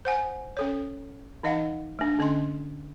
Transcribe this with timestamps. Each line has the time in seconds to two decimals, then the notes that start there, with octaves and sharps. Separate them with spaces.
0.05 C5 F#5 G#5
0.57 C#4 A4 C#5
1.43 E3 D#4 D#5 F5 F#5
1.99 A3 D4
2.19 D3 C#4 D#5 C6